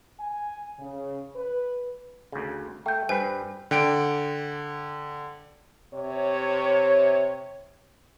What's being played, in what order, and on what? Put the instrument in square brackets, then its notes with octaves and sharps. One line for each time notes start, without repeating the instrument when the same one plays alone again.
[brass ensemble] G#5
C#3
B4
[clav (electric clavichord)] D2 C#3
[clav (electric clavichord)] A3 [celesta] G5 G6
[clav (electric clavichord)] G2 B4 [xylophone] C5 G#5
[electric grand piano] D3 G5 D7
[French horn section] C3 C#5